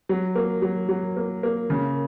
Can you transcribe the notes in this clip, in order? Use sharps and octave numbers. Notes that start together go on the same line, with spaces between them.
F#3
A#3
F#3
F#3
A#3
A#3
C#3